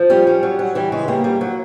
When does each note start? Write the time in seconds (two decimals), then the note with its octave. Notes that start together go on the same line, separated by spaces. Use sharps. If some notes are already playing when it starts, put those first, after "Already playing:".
Already playing: F3
0.10 G3 C#4
0.27 G3
0.43 F#3
0.59 F#3
0.75 E3 G3
0.92 C#3 G#3
1.08 G3 A#3
1.24 G3
1.41 F#3